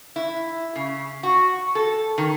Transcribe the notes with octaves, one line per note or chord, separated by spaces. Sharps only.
E4
C#3
F#4
A4
D#3